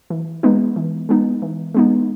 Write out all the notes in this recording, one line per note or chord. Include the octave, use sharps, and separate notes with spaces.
E3
G#3 B3 D#4
E3
G#3 B3 D#4
E3
G#3 B3 D#4